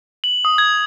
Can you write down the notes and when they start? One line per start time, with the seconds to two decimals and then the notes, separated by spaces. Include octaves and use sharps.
0.24 F#7
0.45 D#6
0.58 G#6